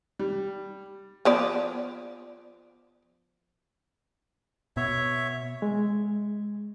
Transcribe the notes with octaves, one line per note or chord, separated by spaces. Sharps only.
G3
F3 B3 D5
B2 C#5 E5
G#3